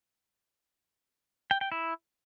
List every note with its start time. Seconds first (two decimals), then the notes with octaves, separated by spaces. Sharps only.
1.51 G5
1.61 G5
1.72 E4